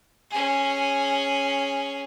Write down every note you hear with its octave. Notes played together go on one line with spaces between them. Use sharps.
C#4 G#4